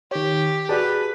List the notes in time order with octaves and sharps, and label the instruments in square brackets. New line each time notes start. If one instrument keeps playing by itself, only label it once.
[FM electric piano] D#3 C#5 [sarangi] G4
[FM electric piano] F#4 D5 A5 [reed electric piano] G#4 [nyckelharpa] B4